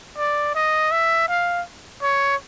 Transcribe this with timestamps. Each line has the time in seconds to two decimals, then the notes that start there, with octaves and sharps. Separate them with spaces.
0.18 D5
0.55 D#5
0.92 E5
1.29 F5
2.02 C#5